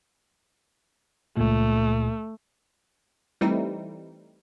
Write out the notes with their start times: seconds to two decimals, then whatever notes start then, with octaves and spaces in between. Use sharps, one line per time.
1.37 C#2 A#2 A3
3.41 E3 G3 A3 C4 D#4 E4